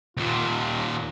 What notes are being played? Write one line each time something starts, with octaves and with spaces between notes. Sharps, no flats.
D#2 A#2 F4